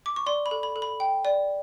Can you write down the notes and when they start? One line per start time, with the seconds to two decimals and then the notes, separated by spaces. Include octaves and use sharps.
0.06 D6
0.16 C#6
0.26 D5 C6
0.46 B5
0.51 A4
0.63 B5
0.76 A4
0.82 B5
1.00 G5
1.25 D5